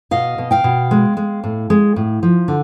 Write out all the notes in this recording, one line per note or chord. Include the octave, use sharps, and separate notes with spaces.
B2 D#5 F5
B2
F5 G5
B2
G#3
G#3
A2
G#3
A2
F3
D3